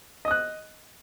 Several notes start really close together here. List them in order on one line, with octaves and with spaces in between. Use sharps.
D#5 D#6 F#6